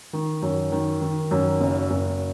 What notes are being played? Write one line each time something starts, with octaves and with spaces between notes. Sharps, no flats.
D#3
F#2
D#3
D#3
F#2
F#1
F#1